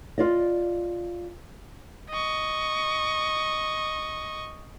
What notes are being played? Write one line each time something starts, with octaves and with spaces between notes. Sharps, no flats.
F4 D5 D#5
D#5 C#6